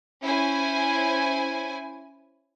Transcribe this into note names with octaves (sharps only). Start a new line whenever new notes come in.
C#4 E4 C5 G#5